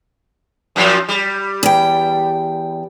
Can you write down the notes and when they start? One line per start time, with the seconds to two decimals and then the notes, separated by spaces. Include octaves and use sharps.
0.76 F#2 A#2 F3
1.09 G3
1.63 E2 G5